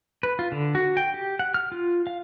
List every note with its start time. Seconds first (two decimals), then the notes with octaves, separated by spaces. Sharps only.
0.23 B4
0.39 F4
0.52 D3
0.75 F#4
0.97 G5
1.14 G4
1.39 F#5
1.54 F6
1.72 F4
2.07 F5